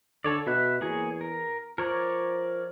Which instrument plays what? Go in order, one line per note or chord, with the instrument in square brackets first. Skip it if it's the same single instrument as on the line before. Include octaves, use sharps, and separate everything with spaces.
[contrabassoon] D3 [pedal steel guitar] A4 C#5 D5
[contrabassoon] B2 [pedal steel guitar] E5 B5 F#6
[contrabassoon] E2 [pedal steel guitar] A#3 G#4 C#5
[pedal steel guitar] A#4
[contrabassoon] F3 [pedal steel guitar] A#4 C#5 D5